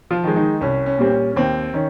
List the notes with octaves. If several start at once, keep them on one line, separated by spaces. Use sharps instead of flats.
F3 F4
D#3
G#3
D#3 D#4
C2 C#4
C#4
A#2 G3 C4
C#4
C#4
D#2 C4
D#3 C#4